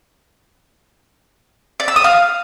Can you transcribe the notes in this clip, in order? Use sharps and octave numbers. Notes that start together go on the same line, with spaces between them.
D5
E6
D#6
F5